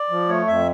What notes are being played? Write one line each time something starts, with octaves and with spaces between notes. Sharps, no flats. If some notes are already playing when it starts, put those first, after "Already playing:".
Already playing: D5
F3
A3 C#5
F2 E5